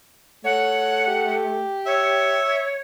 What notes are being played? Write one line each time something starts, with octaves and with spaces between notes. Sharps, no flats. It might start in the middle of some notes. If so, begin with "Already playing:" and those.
A3 C#5 F#5
G4
C#5 E5